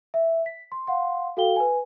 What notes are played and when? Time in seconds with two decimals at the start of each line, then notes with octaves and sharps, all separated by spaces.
0.14 E5
0.46 B6
0.72 C6
0.87 F5 F#5 C6
1.37 F#4 A4 F5 G5 G7
1.56 B4 G#5